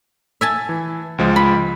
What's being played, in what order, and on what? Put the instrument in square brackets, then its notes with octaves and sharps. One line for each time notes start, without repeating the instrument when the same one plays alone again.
[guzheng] E5 G#5 A5
[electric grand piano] E3
C#2 F3 G#3
[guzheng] B5